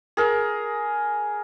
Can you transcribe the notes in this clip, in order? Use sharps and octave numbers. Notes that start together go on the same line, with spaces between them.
G#4 A#4